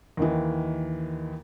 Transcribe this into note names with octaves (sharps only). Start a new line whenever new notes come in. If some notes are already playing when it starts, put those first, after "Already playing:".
D#2 D#3 E3